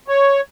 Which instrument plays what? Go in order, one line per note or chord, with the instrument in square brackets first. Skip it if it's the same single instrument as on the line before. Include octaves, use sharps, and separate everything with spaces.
[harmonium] C#5